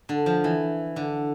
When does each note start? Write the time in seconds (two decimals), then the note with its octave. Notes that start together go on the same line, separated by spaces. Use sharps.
0.09 D3
0.26 F3
0.44 E3
0.96 D3